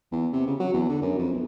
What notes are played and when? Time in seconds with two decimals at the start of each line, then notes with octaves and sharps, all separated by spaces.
0.12 E2
0.33 C3
0.47 C#3
0.60 F#3
0.74 E2
0.89 D3
1.02 F#2
1.18 F2
1.33 B1